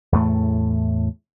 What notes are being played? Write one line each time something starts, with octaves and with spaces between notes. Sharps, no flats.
E2 A2 A3